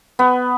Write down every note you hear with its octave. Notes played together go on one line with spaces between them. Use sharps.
B3